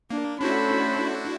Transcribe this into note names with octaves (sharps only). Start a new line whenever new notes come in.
A#3 D4
A3 C#4 D4 E4 F#4 A4 C5 B5